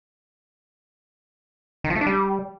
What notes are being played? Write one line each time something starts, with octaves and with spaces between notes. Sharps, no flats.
D#3
F3
A3
D4
G3